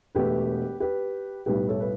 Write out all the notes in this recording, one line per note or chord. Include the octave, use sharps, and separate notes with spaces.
E1 E2 B2 A3 G4 B4
G4 B4
B1 A2 G3 G4 B4
A4 C#5
B4